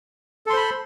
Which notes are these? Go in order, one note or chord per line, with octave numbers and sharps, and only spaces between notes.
A4 C5 B5 C6